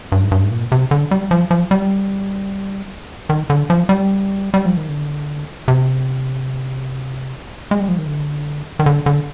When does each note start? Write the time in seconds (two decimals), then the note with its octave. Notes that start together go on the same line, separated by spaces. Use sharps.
0.12 G2
0.23 G#2
0.32 G2
0.44 G#2
0.51 A#2
0.72 C3
0.91 D3
1.11 G3
1.31 F3
1.51 F3
1.71 G3
3.29 D#3
3.50 D3
3.70 F3
3.89 G3
4.54 G3
4.66 F3
4.77 D#3
4.89 D3
5.68 C3
7.71 G#3
7.80 G3
7.88 F3
7.98 D#3
8.07 D3
8.79 D#3
8.86 D3
9.06 D3